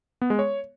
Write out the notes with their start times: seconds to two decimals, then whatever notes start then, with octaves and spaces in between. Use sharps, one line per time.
0.21 B3
0.30 G#3
0.39 C#5